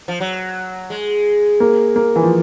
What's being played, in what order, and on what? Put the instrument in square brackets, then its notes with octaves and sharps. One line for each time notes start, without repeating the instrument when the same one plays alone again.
[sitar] F3
F#3
G#3
[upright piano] A#3
A#3
E3
F3